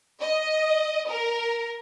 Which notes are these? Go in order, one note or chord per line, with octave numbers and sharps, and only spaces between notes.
D#5
A#4